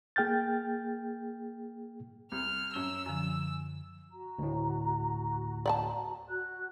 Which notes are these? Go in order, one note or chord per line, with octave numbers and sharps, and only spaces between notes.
A#3 G#4 G5 F6 G6 A6
C2 F6
F#2 C#4 E6 G7
F#2 D3 F3 G#5
F#4 A#5
D2 A2
D5 G5 A5
F#4 F#6